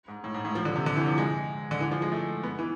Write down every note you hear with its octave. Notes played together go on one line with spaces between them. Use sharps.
G#2
A2
G#2
A2
F3
D3
C3
D3
E3
F3
G#3
D3
E3
F3
G#3
A3
B3
E3